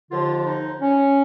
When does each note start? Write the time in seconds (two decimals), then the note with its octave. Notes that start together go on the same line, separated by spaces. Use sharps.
0.12 D#2 D3 F3 F4
0.47 D#4
0.80 C#4